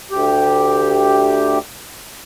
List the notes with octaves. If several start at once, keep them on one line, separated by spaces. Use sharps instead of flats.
D2 G4